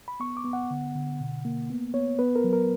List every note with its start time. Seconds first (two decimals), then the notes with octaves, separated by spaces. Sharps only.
0.08 B5
0.20 B3 C#6
0.37 D6
0.45 B3
0.53 F#5
0.71 D3
0.95 D3
1.20 B2
1.45 A#3
1.70 B3
1.94 B3 C#5
2.19 B3 B4
2.36 A#4
2.44 F#3
2.53 A#4